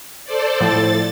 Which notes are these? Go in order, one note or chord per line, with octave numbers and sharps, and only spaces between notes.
A4 C5 D5
A2 F3 A6